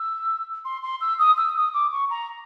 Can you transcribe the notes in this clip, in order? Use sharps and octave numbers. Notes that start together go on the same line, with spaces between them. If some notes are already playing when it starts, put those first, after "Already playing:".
Already playing: E6
C6
C6
E6
D#6
E6
D#6
D6
C#6
A#5